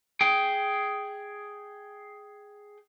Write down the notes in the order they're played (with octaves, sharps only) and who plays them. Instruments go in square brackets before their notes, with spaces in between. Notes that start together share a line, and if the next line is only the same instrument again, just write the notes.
[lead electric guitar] G#4 G5